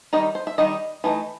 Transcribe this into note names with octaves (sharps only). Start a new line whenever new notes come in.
D#3 G3 D#4 D#5
C5
E5
D#3 G3 D#4 D#5
E3 A3 D#4